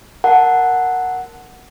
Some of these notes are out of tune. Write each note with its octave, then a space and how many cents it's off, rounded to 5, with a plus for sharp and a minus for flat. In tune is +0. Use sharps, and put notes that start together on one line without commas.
A#4 +0 F#5 +0 A5 +0